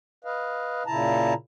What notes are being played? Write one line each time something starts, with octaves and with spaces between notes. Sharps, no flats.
B4 D#5 F5
A#2 C#3 E4 A5 A#5